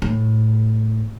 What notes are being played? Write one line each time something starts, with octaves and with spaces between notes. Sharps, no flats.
A2